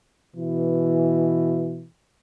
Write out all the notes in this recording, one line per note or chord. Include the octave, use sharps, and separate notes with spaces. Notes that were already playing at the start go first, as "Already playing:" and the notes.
B2 E3